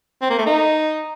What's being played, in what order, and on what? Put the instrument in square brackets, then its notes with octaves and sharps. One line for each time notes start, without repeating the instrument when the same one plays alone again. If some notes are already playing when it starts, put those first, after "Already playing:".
[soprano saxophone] C4
A#3
A3
D#4